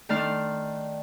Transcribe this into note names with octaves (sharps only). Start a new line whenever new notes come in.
D#3 A3 D4 A5 C6 F6